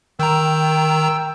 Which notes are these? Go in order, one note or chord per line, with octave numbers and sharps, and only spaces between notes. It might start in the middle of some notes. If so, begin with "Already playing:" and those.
D#3 G5 A#5 E6